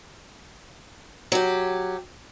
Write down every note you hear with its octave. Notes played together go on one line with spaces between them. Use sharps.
F#3 G4